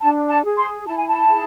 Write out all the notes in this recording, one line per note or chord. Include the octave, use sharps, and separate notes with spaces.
D4 A5
A5
G#4
C6
E4 A5
G#5
A5
G#4